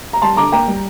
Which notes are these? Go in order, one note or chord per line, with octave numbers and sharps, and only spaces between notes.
A#5
G3 A5 C6
D3 A#5 D6
A#3 G5 A#5
G3